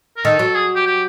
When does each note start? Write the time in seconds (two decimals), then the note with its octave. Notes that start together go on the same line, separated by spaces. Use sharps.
0.17 A#4
0.25 D#3 A4
0.39 F#3
0.55 G#4
0.76 G4
0.86 G4